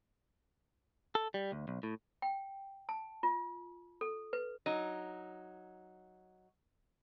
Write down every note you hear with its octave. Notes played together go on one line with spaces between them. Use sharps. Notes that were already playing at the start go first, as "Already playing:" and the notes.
A4
G3
D2
B1
A2
G5
A5
F4
A4
B4
F#3 D#4